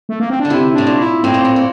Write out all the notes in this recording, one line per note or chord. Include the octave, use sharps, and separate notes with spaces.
A3
A#3
C4
D4
D3
C3 E4
A2 D4
A#2
E4
A2 C4
A#2
A2
A#2